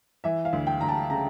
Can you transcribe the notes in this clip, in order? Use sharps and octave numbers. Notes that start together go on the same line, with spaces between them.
E3 E5
F5
D2
G5
D2 A#5
A5
C#3 A#5